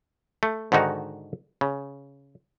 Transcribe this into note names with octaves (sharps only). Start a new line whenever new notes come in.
A3
G#2 D3 D#3 D#4 F#4
C#3